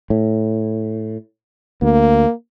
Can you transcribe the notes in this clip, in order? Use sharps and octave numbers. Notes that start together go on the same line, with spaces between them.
A2
D2 A#3